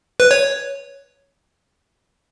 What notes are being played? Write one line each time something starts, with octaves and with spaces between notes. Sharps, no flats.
B4
C#5